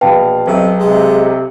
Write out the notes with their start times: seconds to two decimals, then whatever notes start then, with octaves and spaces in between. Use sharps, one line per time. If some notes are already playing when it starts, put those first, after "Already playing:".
0.01 A#1 B2 B4 F5 G5 A5
0.47 B1 C3
0.80 C3 G#3